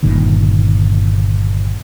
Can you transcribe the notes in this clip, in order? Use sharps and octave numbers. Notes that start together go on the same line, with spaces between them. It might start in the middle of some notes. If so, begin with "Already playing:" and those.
G1 G2 A#2 D#3